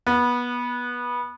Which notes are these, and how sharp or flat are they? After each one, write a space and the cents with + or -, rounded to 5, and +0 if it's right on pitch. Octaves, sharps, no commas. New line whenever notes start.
B3 -20